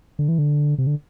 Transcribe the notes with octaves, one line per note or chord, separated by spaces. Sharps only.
D3
E3
D3
C3
D3